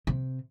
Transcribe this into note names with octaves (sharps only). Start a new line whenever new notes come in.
C3